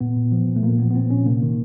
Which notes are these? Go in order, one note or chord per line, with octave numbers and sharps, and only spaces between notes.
A#2 B3
A#2
F3
A#2
A3
A#2 A#3
F3 B3
B3
A#2 C4
A#2 C#4
C3 A#3
D#3